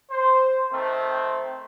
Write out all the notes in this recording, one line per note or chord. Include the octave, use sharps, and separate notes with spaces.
C5
D#3 A3 C4